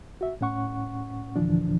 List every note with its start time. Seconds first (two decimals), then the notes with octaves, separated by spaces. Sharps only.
0.21 F#4 E5
0.41 A2 C#4 F#5 C#6
1.36 D#2 A#2 D3 E3 F3 D4